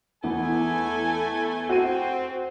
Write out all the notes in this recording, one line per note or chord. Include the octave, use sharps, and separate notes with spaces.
E2 E3 A3 B3 G#5
C4 F#4 D#7